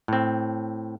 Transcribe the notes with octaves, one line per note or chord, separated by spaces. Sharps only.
A2 C4